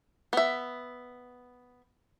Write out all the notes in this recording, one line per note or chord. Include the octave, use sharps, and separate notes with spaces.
B3 E5